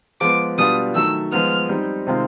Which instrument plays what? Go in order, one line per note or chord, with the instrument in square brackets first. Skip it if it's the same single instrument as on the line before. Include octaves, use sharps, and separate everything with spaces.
[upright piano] F3 G#3 B3 [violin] D6
[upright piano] B2 G3 B3 D4 F4 [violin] D#6
[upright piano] D#3 F#3 A3 [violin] E6
[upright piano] F3 G#3 B3 [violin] F6
[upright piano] G3 C4 D#4
C3 D#3 G#3 C4 F4